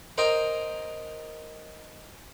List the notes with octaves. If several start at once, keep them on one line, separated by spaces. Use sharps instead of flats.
A#4 C5 D#5 G5 G#5 A#5